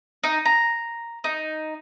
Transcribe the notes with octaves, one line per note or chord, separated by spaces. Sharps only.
D#4
A#5
D#4